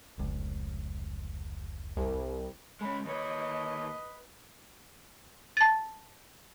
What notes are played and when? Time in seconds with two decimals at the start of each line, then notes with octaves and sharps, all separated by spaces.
0.18 F1 C#2
1.97 C2
2.81 G#3 C#4 B5
3.05 D#2 B4 C#5 D#5
5.57 A5 A6